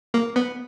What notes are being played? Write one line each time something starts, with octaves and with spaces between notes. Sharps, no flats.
A#3
B3